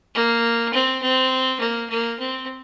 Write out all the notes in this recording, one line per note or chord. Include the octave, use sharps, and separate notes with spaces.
A#3
C4
C4
A#3
A#3
C4